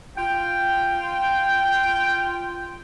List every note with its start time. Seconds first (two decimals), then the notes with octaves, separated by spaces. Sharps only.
0.17 F4 G5